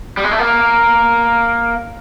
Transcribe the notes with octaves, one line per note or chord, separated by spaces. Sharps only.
G3
G#3
A3
A#3